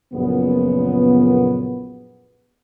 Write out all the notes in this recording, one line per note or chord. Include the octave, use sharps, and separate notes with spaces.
A#1 F#2 A#2 C#3 B3